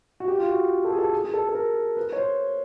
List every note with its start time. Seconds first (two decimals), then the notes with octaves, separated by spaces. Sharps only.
0.20 F#4
0.28 G4
0.38 F4
0.49 F#4
0.84 A4
0.93 G#4
0.98 A4
1.13 G#4
1.24 G#4
1.33 A4
1.49 A4
1.55 A#4
1.97 B4
2.12 C#5
2.18 C5